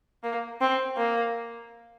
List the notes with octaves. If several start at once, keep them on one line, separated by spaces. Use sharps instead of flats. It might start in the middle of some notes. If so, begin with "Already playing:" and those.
A#3
C4
A#3